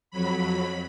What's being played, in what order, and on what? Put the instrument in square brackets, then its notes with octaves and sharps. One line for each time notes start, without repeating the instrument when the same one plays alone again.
[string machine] F2 F#3 B5